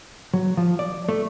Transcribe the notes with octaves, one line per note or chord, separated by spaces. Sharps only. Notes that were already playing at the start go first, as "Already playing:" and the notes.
F#3
F3
D5
A3